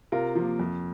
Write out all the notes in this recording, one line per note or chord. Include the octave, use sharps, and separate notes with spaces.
C3 F4 A#4
F3 A#3
F2